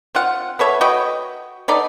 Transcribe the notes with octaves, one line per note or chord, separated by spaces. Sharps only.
C4 F4 F#5
B3 A4 C#5 E5
F#4 B4 D#5 G5
B3 D#4 A4 D5